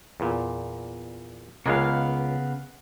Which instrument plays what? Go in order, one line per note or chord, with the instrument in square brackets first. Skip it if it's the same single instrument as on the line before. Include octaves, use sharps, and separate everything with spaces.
[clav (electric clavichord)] E2 A#2
[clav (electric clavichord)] C#2 G#3 A#3 [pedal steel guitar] C#3 B3 F5